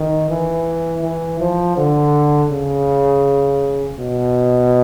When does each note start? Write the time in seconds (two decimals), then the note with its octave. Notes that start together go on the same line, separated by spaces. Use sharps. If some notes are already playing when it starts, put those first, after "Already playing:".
Already playing: D#3
0.30 E3
1.03 E3
1.40 F3
1.77 D3
2.51 C#3
3.99 B2